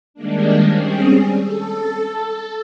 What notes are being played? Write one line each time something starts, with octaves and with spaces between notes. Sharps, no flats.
D#3 G3 G#3 A#3 D4
G3 C4 C#4 G#4
A4